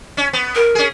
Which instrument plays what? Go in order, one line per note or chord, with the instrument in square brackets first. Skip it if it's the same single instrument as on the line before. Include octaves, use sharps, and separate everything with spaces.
[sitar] C#4
B3
[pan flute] A#4
[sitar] C#4 G#4